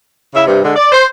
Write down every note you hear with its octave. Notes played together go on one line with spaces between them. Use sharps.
C#3 E4 E5
G2 C3
D3 G#3
D5
C5